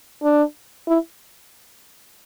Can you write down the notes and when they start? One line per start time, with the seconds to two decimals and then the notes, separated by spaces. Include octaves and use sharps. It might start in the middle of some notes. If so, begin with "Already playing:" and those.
0.23 D4
0.88 E4